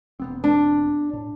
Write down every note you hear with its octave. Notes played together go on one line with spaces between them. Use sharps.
E1 B3 C4
D4
A2